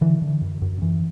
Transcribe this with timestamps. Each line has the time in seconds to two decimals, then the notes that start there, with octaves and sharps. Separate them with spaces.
0.01 D3 E3
0.22 D3
0.41 F#2
0.62 F#2
0.82 F#2 E3